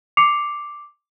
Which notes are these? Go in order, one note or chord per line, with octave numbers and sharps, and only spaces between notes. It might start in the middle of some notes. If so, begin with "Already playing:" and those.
D6 C7 C#7 F7